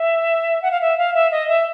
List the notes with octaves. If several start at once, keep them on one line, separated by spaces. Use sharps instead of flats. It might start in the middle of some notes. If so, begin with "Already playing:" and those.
Already playing: E5
F#5
F5
E5
F5
E5
D#5
E5